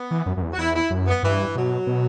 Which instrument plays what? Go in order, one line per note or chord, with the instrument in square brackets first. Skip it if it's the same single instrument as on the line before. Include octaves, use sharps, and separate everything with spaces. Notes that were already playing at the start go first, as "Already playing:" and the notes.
Already playing: [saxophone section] B3
[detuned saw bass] E3
F#2
F#2
E2
[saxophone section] F#4
[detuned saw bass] E2 [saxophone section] E4
[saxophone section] E4
[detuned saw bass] F#2
[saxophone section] B3
[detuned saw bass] G2 [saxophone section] E3
[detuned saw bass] B2 [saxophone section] F#3
[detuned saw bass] B2